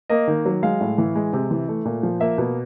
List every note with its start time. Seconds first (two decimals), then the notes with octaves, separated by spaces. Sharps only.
0.10 A#3 D#5
0.28 D#3
0.45 F#3
0.63 G#3 F5
0.81 A2
0.98 E3
1.15 G#3
1.33 C3
1.51 E3
1.68 A3
1.85 A#2
2.03 F3
2.20 A#3 E5
2.38 B2